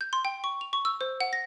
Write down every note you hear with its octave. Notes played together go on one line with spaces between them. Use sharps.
G6
C6
G5
C#6
F7
C#6
E6
C5
F#5
A#6